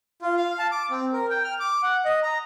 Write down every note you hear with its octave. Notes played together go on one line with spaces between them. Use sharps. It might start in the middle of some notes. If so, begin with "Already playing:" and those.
F4
F5
A5
D6
C4
A#4
G5
F6
D6
F#5
D#5
A#5